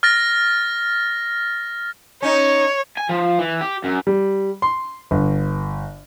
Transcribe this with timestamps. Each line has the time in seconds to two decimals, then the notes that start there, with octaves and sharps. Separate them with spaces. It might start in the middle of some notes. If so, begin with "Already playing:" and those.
0.03 F6 A6 A#6
2.22 C#4 D#4 C#5
2.97 G#5
3.09 F3
3.39 E3
3.61 G4
3.84 F#2
4.07 G3
4.62 C6
5.11 G1